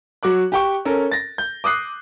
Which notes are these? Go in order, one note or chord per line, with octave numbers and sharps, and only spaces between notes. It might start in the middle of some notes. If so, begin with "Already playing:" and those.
F#3 F#4 D6 F#6
G4 G5 C#6
C#4 A4 A#4
A6 A#6
G6
D6 D#6 F#6 C7